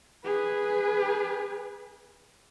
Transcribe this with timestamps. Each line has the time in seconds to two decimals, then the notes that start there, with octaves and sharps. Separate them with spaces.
0.25 G#4 B4